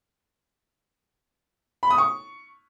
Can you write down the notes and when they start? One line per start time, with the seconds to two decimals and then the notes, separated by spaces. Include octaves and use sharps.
1.83 B5
1.90 D#6
1.98 C#6